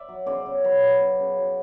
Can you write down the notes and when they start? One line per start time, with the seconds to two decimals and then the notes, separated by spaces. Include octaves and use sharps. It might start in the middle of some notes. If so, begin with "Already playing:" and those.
Already playing: D5 E5
0.09 F#3
0.26 C#3 C5 D5
0.46 C#3
0.64 F#3 B4 C#5
0.83 F#3
1.01 C#3
1.20 C#3
1.38 F#3